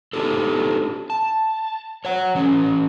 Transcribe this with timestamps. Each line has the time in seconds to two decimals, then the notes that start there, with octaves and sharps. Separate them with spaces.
0.13 D4 D#4 G4 A4
1.10 A5
2.05 C#5 F#5
2.35 E3 C#4